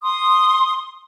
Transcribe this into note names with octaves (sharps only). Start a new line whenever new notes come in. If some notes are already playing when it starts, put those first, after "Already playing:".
C6 D#6